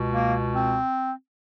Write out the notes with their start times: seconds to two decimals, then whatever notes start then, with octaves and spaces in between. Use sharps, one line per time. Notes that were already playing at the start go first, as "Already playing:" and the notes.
Already playing: C#2 B2
0.13 A#3
0.55 C4